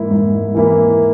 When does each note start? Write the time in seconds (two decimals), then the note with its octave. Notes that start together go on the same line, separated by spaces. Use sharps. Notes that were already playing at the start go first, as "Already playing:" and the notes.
Already playing: G#2 E3 A#3 E4
0.11 G#2
0.54 E3 A#3 E4